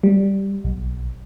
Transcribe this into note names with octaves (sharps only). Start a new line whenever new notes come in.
G3
B1